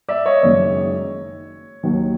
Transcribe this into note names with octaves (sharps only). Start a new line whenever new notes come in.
D5 E5
C#5 D#5
F#1 F#2 D#3 G#3 C#5
D#2 D#3 F#3